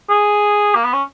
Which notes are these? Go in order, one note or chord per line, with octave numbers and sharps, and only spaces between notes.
G#4
A#3
B3
C#4